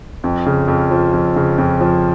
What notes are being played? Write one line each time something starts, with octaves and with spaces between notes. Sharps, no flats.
F2
C#3
F2
F3
F2
C#3
F2
F3